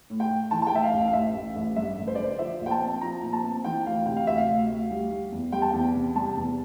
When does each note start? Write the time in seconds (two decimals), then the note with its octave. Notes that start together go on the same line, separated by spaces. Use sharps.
0.10 A2
0.20 G5
0.30 A2
0.51 E3 A5
0.62 A5
0.67 G5
0.72 A2 E5
0.83 F5
0.93 A1 F5
1.07 F5
1.13 A1 E5
1.35 A1
1.56 A1
1.76 G2 E5
1.98 A1
2.07 C5
2.15 D3 D5
2.24 C5
2.39 F3 E5
2.61 A#1
2.66 G5
2.71 A5
2.81 C4
3.01 F3 A#5
3.22 A#2
3.33 A5
3.44 C4
3.64 E3 G5
3.86 D2 F5
4.06 C3 G5
4.16 F5
4.27 D2 E5
4.38 F5
4.48 D2
4.70 D2
4.90 G3
5.11 G3
5.32 E2
5.52 G3 G5
5.62 A5
5.70 E2 G5
5.94 C3
6.16 G3 A5
6.37 E2